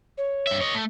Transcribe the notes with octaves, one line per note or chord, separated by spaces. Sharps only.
C#5
G2 E5
C#5 D#5
A3